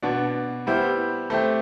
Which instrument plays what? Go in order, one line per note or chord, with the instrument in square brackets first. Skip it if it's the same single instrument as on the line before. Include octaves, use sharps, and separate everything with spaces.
[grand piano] B2 B3 D4
G3 B3 E4 G4 C5
A3 C4 G4